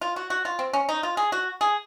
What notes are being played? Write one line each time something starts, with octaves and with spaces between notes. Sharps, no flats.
F4
F#4
F#4
F4
C4
C#4
D#4
F4
G#4
F#4
G#4